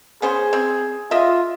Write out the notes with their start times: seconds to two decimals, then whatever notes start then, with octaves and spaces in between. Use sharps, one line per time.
0.22 B3 C#4 G#4 C5
0.53 C4
1.11 F4 D#5 E5